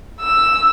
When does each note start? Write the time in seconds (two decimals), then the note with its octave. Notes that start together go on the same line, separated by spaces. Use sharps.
0.21 E6